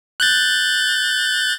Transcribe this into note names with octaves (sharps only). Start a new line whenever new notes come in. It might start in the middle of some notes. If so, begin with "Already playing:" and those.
F#6 G6 A6